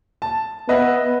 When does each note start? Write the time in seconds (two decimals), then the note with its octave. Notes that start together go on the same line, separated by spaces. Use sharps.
0.22 A5
0.69 B3 B4 D#5 E5